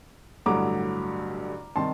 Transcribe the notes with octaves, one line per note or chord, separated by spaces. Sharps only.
A1 G2 D3 F#3 A#5 D6
C3 D#3 G3 A5 C6